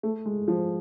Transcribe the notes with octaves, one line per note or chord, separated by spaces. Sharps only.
A3
G#3
F3